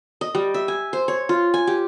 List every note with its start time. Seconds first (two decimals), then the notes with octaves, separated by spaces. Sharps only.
0.21 D#5
0.35 G3
0.54 E5
0.68 G#5
0.93 C5
1.08 C#5
1.29 F4
1.54 G#5
1.67 G4